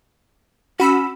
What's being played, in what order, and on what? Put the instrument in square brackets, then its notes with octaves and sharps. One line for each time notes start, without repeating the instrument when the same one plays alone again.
[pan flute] C#4 [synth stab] F#4 B5 E6